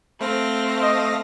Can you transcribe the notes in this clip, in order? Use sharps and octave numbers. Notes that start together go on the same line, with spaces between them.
A3 C4 F5 A#6
D#5